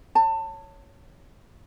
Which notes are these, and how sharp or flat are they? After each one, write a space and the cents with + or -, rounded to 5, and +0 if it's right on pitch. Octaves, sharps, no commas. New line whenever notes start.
C#5 +0 A5 +25